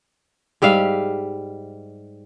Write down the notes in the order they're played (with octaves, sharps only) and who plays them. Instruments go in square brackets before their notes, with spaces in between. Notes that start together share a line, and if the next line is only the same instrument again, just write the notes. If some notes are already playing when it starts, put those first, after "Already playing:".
[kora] G#2 G3 E5 F5